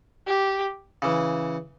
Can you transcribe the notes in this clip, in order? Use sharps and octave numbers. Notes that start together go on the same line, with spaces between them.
G4
C#3 E3